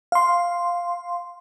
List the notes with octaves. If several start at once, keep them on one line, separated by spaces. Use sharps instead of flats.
F5 C6